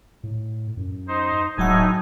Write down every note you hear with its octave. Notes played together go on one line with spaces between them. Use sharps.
A2
F#2
D#4 C5
D1 G#1 A2 F#3 D#4 F#5 G#5